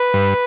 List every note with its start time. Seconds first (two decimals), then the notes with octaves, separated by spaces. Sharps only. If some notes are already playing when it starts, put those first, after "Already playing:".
Already playing: B4
0.14 G2